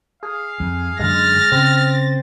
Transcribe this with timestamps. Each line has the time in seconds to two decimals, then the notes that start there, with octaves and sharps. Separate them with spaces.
0.23 G#4 F5
0.60 F2
1.00 F#2 D3 G#3 F6 A6 A#6
1.52 C#3 C4